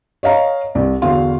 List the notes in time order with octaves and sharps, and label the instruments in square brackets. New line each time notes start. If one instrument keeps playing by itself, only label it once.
[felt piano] C#5 D#5 F5 A#5
C2
E2 D3 F#4 F5 C6